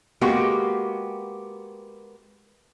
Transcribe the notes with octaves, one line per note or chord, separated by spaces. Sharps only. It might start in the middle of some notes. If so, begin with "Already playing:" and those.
G#3 A#3 B3 F#4 G4